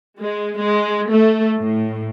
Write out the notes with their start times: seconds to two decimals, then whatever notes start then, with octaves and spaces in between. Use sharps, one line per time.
0.19 G#3
0.58 G#3
1.10 A3
1.59 A2